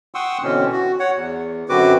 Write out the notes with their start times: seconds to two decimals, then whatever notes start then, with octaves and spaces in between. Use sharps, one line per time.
0.15 F#5 G5 C6 C#6 D#6 E6
0.43 B2 D3 E3 C4 C#4
0.72 F#4
1.00 C#5 F#5
1.15 E2
1.69 F#2 D3 C4 F#4 B4 D6